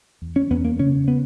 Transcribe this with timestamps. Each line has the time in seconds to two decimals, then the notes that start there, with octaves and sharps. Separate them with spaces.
0.22 E2
0.36 C#4
0.50 E2 B3
0.65 A#3
0.79 C#3 C#4
1.08 B3